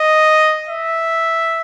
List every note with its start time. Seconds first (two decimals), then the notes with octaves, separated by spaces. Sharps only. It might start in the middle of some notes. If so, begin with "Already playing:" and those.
Already playing: D#5
0.69 E5